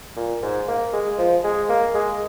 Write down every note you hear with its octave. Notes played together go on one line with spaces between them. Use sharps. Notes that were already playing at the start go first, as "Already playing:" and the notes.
A#2
G#2
A#3
G#3
F3
G#3
A#3
G#3